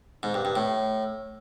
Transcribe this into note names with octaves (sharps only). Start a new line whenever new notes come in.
G#2
G2
G2
A2